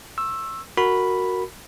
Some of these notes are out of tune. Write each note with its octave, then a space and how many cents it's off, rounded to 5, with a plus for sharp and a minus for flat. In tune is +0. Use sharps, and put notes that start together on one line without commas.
C#6 -40 E6 +5
F#4 +0 A#4 -10 B5 +0